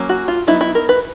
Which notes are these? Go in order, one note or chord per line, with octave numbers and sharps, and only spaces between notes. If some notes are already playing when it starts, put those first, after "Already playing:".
Already playing: F#3 A#3 C#4
F#4
F4
F#3 B3 D#4 E4
E4
A#4
B4